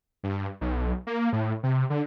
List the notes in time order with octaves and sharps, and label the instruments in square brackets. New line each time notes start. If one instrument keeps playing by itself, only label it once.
[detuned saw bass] G2
B1
A#3
A2
C3
D3